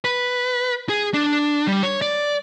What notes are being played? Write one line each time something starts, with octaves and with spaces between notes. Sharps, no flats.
B4
G#4
D4
G3
C#5
D5